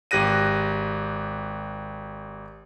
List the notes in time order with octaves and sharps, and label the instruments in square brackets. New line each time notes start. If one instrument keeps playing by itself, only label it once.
[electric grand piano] G#1 G4 F#6 A#6 D#7